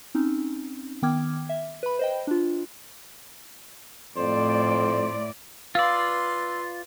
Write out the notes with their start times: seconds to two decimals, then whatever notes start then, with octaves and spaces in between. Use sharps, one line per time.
0.15 C4 C#4 D#4
1.02 D#3 B3 G5 D6 F6 G#6
1.49 E5
1.83 B4 B5
1.99 C5 D#5 G5
2.27 D4 F4
4.17 F2 A2 C5 D5
5.75 F4 B4 D5 F5 C6 E6